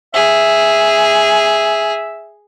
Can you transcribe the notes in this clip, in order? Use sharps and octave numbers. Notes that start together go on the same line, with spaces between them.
G#4 E5